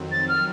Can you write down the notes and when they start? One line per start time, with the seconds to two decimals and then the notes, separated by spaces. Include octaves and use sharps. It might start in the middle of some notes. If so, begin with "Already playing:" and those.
Already playing: F2 D#3 F#3 C4
0.12 A6
0.28 F6